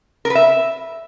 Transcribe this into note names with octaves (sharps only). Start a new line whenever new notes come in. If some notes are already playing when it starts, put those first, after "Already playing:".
A#4
B4
E5